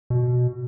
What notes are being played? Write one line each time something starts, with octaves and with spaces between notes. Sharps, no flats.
B2